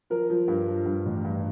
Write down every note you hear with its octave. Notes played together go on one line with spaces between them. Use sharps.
F3 A#4
F3
G2
F3
G2
A1
G2